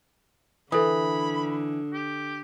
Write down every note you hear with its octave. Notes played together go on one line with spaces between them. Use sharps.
D3 E3 A4 B5 D#6
G4